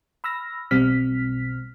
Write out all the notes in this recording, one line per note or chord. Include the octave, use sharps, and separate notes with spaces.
B5 E6 F6 A#6
B1 B2 G3 C4 F6 B6